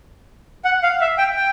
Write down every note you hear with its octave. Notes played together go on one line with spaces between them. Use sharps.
F#5
F5
E5
G5
G5